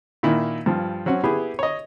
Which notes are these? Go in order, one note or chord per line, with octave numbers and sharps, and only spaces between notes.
A#2 D#3 E4
G2 F3
F#3 C4 C#4 F#4
B3 E4 G4 G#4
C#5 D#5